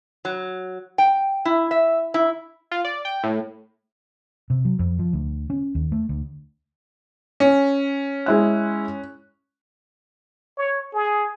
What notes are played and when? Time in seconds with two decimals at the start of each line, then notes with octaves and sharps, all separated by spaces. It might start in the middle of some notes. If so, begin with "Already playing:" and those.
0.25 F#3
0.98 G5
1.45 E4
1.71 E5
2.14 E4
2.72 F4
2.85 D5
3.05 G5
3.23 A2
4.50 C3
4.65 F#3
4.79 F2
4.99 F3
5.13 D2
5.50 C#4
5.75 D#2
5.92 A3
6.09 D2
7.40 C#4
8.26 G#3 E4 F#6
10.58 C#5
10.93 G#4